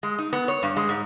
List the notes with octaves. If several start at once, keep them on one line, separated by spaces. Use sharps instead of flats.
G#3
D#4
B3
C#5
G2
G#3
G#2